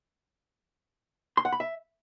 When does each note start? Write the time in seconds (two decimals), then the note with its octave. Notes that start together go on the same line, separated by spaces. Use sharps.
1.37 C6
1.45 F#5
1.52 B5
1.60 E5